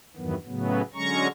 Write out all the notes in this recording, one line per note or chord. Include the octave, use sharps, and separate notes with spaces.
E2 G2 D#3 E3 F#3 B3
A2 C#3 F#3 B3
D3 F#3 G#3 C#4 A#5 C#6